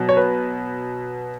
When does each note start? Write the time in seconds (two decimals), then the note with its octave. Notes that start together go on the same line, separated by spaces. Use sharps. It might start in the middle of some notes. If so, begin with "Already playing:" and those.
Already playing: B2 F#3
0.09 C#5
0.17 B4